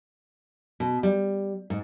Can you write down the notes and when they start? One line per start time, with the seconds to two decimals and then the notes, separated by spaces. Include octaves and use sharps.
0.80 B2
1.03 G3
1.70 G#2